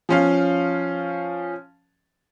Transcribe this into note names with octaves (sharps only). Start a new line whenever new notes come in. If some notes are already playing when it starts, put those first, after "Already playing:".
F3 C#4 F5